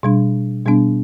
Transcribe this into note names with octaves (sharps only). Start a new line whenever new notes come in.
B2 G3 D4
B2 G3 B3 D4